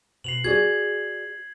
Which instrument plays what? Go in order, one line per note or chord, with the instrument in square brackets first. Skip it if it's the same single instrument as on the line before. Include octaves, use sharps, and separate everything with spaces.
[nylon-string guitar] B2 [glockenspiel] C7 F7 F#7
[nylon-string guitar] F#4 G#4 D5 [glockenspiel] G#6